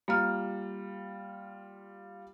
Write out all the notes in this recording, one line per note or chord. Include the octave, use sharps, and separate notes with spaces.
G3 A#3 F4 F6